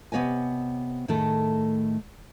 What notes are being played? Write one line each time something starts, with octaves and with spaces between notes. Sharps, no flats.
C3 B3 C#5 D#5 G#5
A2 D#3 A3 G#4 A4